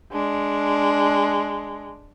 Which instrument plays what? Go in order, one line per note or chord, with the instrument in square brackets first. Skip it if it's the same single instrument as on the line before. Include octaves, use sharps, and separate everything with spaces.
[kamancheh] G#3 D4